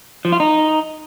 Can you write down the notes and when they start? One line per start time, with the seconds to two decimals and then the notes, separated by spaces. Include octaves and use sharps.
0.25 F3
0.32 F4
0.40 D#4